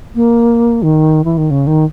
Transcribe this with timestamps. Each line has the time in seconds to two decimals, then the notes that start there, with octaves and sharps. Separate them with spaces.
0.15 A#3
0.82 D#3
1.24 E3
1.37 D#3
1.51 C#3
1.67 D#3